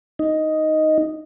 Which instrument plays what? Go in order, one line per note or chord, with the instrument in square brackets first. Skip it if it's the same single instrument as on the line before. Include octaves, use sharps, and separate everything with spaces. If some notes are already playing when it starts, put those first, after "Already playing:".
[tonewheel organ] D#4